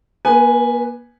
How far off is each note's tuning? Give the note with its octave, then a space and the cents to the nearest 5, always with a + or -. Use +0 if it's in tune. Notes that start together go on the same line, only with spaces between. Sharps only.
A#3 +40 B4 -5 G#5 +0